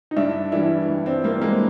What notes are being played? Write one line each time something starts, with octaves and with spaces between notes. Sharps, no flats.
D#4
G2 D4 E4
E3 G3 D4 E4
G2
C4 D4
E3 G3 A#3 C4
G#3 A#3